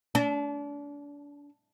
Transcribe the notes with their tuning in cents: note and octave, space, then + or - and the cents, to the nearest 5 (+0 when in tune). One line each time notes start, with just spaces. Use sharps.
D4 -35